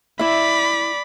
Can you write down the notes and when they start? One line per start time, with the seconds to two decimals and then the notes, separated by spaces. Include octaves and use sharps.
0.19 E4 D5 E5 B5